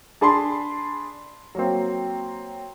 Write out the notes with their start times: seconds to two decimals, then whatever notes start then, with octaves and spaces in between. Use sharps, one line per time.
0.21 D4 G#4 A5 B5 C6
1.55 F#3 A#3 C4